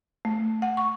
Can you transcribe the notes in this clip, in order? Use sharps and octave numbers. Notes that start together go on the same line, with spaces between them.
A3
F#5
C#6